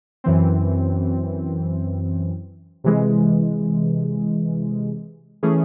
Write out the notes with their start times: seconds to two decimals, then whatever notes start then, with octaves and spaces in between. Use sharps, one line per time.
0.24 F#2 E3 C4
2.84 C3 E3 G#3
5.43 E3 A3 C#4 G#4